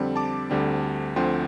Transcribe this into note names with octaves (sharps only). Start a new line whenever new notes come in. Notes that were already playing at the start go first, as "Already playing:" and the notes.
Already playing: F2 D3 G3 C4
A5 D6
D2 D3 G3 C4
D2 D3 F3 C4 G5 C6